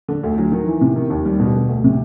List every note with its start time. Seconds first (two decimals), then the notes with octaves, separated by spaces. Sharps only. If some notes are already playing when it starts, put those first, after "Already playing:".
0.09 D3
0.23 D2
0.38 F#3
0.52 D#3
0.67 E3
0.81 C3
0.96 D#3
1.10 D#2
1.25 G3
1.40 B2
1.54 D3
1.69 D2
1.84 C3